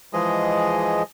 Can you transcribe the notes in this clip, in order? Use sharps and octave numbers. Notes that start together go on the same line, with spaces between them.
E3 F3 G#3 G#4 D#5